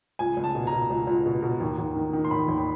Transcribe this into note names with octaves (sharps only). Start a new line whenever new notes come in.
C#2 G#5
C#2
A5
B2
A#5
B2
C#2
C#2
B2
B2
D#2
D#2
D#3
D#3
C6
D#2 B5
D#2
B5